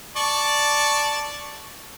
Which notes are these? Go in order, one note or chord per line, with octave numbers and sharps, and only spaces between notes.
D5 A5 C#6